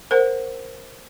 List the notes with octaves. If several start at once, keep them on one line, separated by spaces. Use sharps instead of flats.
A#4 C5 F#5